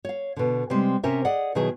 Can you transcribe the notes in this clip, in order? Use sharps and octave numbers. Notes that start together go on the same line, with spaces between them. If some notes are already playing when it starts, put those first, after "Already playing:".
C#5 F5
B2 D3
C3 G3 G#3 C4
C3 C#4 A#4 C5 E5
G#4 D5 D#5 F#5
B2 D#3 F#3 E4 G#4